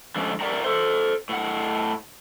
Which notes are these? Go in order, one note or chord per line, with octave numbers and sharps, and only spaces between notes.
D3 F3 G#3 A3 C#4
A#4 D5 E5 F#5 G5 A#5
A4 C5
A2 F#5